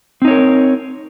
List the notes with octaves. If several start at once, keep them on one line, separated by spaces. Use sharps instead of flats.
C4 D#4 A#4 C#5